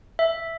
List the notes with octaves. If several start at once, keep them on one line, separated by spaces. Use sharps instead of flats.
E5